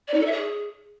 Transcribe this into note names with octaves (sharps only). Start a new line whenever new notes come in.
D5
D#4
A4
E5
G#4